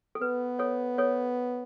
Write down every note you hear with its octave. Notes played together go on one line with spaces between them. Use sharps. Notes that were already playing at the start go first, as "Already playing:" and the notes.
A4
B3 B4
A4 C#5
A4 C#5